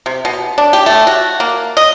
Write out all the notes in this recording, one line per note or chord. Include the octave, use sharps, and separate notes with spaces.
C3
B2
D4
G4
A3
F#4
A#3
D#5